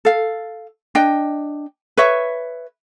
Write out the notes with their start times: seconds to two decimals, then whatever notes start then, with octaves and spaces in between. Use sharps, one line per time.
0.05 A4 F5
0.95 D4 D#5 G5
1.97 B4 C#5 E5